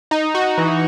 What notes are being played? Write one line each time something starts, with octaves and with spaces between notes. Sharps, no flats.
D#4
F#4
E3